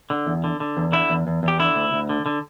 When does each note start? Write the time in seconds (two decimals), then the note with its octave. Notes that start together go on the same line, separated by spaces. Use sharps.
0.10 D3
0.27 E2
0.44 D3
0.60 D3
0.77 E2
0.92 D3 E4
1.10 E2
1.27 E2
1.43 E2 G4
1.59 D3 E4
1.76 D2
1.93 D2
2.09 D3
2.26 D3